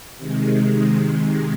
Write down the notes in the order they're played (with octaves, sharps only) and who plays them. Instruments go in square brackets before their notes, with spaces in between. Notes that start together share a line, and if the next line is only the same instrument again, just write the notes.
[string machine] C3 D#3 G#3